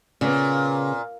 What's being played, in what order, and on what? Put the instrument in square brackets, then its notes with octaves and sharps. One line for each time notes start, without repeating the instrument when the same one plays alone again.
[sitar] A#2 [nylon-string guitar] C#3 B3